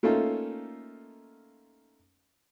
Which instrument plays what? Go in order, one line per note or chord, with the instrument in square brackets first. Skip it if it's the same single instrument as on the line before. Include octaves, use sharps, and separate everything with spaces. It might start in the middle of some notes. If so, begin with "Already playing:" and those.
[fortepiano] A3 A#3 C#4 D#4 F4 A4